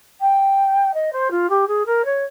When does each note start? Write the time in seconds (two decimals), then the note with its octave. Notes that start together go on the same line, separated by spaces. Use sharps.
0.20 G5
0.94 D#5
1.12 C5
1.30 F4
1.49 G4
1.67 G#4
1.86 A#4
2.04 C#5